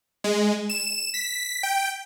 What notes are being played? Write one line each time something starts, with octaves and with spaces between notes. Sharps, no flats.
G#3
E7
B6
G5